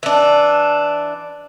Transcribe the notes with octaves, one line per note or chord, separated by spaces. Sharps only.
E3 D4